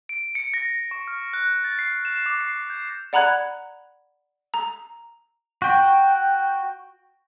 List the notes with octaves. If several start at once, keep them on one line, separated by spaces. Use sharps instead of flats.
D7
C#7
A#6
C#6
F6
F#6
A6
C7
E7
D6
C7
G6
D5 F#5 A#5 B5 F#6 G#6
A#5
F#4 G5